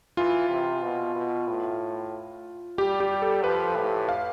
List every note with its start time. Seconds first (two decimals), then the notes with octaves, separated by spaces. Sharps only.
0.17 E3 F4
0.49 C3
0.82 B2
1.15 B2
1.48 A2
2.78 G3 G4
3.00 G4
3.22 A4
3.44 F3 B4
3.77 A2
4.09 F5